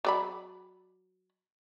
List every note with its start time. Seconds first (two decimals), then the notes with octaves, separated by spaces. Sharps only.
0.05 F#3 D5 B5